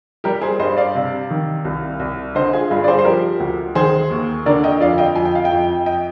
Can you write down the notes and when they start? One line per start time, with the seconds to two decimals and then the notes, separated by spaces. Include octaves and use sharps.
0.24 G3 G4 A#4
0.42 G#4 C5
0.59 G2 C5 D#5
0.77 D5 F5
0.95 C3
1.30 D#3
1.65 C2
2.00 C2
2.35 D3 C5 D#5
2.53 F4 G#4
2.71 G2 F4 G#4
2.84 D5
2.88 G#4 C5
2.99 C5
3.05 F3 G4 A#4
3.40 D2
3.75 D#3 G#4 C5
4.11 D#2
4.46 D3 A#4 D5
4.64 D#5 G5
4.80 F2 D5 F5
4.98 D#5 G5
5.15 F2 G#5
5.25 G5
5.35 F5
5.44 D#5 G5
5.52 F2
5.86 D#5 G5